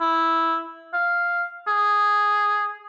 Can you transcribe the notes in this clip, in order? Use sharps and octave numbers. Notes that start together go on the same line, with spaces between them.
E4
F5
G#4